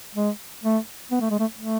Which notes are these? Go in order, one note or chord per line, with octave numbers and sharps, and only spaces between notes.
G#3
A3
B3
A3
G#3
A3
A3